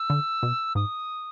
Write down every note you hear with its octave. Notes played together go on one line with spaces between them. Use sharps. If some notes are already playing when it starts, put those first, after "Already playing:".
Already playing: E6
D3
B2
G#2 D#6